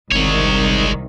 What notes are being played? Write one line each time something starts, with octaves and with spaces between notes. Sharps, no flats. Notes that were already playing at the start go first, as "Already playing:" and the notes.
G1 C2 D#3 G#3 C#5